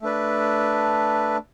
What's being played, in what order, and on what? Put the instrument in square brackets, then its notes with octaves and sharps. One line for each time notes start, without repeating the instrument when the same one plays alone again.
[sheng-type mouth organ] A3 D4 B4